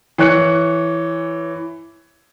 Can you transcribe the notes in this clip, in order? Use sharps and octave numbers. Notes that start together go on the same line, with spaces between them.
E3 C#5 F#6 C#7